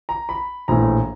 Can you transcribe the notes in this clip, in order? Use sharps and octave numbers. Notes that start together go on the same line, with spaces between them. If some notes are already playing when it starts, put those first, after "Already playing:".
A#5
B5
A#1 A2 E3 A#5